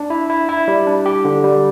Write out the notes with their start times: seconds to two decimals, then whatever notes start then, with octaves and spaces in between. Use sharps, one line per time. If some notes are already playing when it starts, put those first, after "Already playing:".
Already playing: D4
0.10 E4
0.30 E4
0.49 E4
0.68 G3
0.87 D4
1.06 G4
1.25 D3
1.44 G3